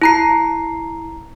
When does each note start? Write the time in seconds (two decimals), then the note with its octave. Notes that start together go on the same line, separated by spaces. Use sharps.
0.02 E4 A#5 C7